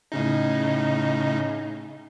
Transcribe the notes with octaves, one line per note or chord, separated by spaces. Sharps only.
A2 C#3 D#4